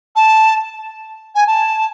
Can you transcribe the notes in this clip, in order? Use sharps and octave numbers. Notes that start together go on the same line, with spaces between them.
A5
G#5
A5